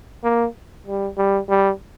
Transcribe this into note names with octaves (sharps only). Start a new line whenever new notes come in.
A#3
G3
G3
G3